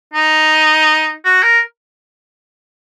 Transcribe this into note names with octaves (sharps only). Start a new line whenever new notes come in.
D#4
F#4
A#4